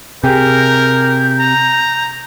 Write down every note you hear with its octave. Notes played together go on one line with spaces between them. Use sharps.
C3 G4 G#4 A#4 G6
A#5